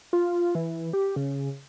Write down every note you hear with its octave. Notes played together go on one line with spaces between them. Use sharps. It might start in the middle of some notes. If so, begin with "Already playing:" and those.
F4
E3
G4
C#3